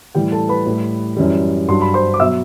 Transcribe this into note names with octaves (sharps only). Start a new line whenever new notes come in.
A2 E3 G3 G4 G5
A4 A5
B4 B5
A2 G3
F#2 E3 G3
G2 F#3 C6
B5
C5 C6
D6
B2 F#3 E5 E6